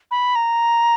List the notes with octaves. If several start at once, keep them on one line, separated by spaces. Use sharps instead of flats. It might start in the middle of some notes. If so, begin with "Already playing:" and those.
B5
A#5